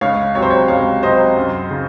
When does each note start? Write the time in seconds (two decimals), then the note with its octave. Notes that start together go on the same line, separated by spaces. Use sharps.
0.01 C#2 C#5 F5
0.35 C3 F#3 C#5
0.42 C5
0.50 C#5
0.68 C#2 C#5 F5
1.02 C3 F#3 C5 D#5
1.36 F#2
1.71 C#3